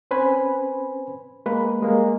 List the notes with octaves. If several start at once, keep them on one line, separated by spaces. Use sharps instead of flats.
C4 C#4 B4 C5 G#5 B5
G#3 A#3 B4
G3 G#3 A#3